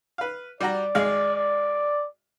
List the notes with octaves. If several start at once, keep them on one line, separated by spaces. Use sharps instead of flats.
B4 F5
G3 F#4 D5 A#5
G#1 G#3 F5
D5